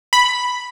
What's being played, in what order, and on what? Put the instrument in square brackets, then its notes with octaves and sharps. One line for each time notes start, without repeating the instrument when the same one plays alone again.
[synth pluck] B5